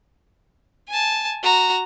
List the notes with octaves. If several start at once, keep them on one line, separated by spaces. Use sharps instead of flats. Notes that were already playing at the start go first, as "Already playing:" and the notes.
G#5 A5
F#4 A#5